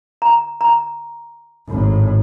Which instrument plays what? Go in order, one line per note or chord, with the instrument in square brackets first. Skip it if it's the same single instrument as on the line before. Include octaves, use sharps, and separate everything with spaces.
[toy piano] A#5
A#5
[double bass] G#1 A2